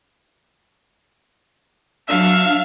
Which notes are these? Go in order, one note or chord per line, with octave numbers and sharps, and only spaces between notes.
F#3 D4 E5 F5